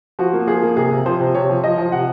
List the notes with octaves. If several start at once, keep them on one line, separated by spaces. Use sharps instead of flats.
F3 F#4
A#3
F3 G#4
A#3
C3 G#4
C3
F3 C5
C3
C3 C#5
F3
F3 D#5
F3
C3 F#5